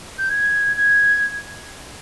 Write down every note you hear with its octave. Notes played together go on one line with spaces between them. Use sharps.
G6
G#6
G#6